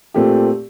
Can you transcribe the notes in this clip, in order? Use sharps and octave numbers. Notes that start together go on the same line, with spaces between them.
A#2 A3 C4 G4